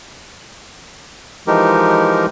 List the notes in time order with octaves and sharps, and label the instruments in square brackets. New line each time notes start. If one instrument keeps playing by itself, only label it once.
[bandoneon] E3 F3 G#3 D#4 G4 A#4